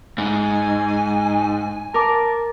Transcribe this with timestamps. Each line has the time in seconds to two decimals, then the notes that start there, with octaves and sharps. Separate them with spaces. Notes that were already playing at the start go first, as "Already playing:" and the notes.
0.18 G#2 G#5
1.94 A#4 A5 D6